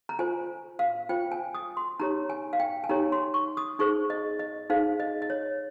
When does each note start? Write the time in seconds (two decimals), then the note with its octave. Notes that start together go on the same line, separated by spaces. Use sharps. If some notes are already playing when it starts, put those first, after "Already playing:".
0.09 A#5
0.19 F4 C5 G#5
0.79 F5
1.09 F4 C5 G5
1.32 G#5
1.55 D#6
1.77 C6
2.00 D#4 G4 C#5 A#5
2.30 G#5
2.53 F5
2.60 G5
2.84 G#5
2.89 D#4 G4 C#5 A#5
3.12 C6
3.34 C#6
3.57 D#6
3.79 D#4 G#4 C5 C#6
4.10 D#5
4.39 D#5
4.70 D#4 G#4 C5 F5
5.00 D#5
5.22 D#5
5.30 C#5